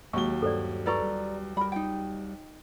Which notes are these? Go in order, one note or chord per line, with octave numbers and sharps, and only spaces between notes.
D#2 F#3 G#3 C#6 G7
G2 A4 C5 D5
F4 A4 B4 D5 A#5 C#6
G3
G3 A#4 B5
D#4 F4 G5